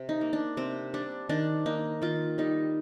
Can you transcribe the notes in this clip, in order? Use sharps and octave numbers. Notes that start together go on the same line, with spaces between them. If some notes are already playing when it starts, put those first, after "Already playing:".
Already playing: C3
D#4
A#3
D4
C3 C4
G3 D4
D#3 D4
A#3 D#4
D#3 F4
G3 D#4